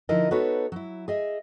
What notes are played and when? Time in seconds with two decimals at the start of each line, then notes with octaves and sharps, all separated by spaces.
0.09 D3 F3 D#4 E4 A#4 D#5
0.31 B3 D#4 F#4 A4 B4 C#5
0.72 F#3 E4
1.08 G#4 D#5 E5